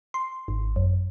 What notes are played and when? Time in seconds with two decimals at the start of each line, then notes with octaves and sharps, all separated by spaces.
0.14 C6
0.48 G#1
0.76 F#2